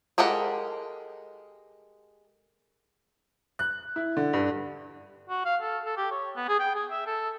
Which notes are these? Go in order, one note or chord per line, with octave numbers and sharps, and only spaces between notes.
G#3 G4 A4 A#4 F#5
F#6
E4
D3
G2
F#4
F5
A4
A4
G4
C#5
B3
G#4
G5
G#4
E5
A4